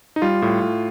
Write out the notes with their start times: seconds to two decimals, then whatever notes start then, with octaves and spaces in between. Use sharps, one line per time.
0.16 D#4
0.22 G3 F4
0.42 A2
0.62 A2